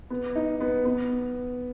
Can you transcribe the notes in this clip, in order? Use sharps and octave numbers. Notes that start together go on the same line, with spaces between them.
B3
D#4
B3
B3